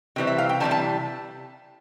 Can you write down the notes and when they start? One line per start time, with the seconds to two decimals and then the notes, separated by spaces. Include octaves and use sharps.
0.16 C3 E3 G3 C4
0.27 E5
0.38 F5
0.49 G5
0.60 C3 E3 G3 C4 A5
0.71 A5